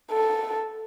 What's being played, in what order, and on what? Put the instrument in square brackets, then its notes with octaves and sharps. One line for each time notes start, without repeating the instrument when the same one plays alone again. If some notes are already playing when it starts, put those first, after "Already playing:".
[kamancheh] A4